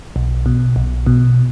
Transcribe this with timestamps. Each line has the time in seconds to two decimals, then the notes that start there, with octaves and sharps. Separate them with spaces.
0.16 B1
0.46 B2
0.76 B1
1.07 B2